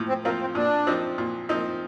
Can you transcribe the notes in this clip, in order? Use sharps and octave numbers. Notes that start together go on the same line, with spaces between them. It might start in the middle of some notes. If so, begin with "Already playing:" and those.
Already playing: A2 F3
C4
F3 A#3 C4 F4
C4
A#2 D4
F3 C4 D#4
A#2
F3 C4 D#4